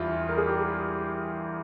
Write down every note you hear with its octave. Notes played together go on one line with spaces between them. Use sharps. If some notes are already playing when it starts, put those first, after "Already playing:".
Already playing: E2 G3 E4 F4
A#4
G#4
G4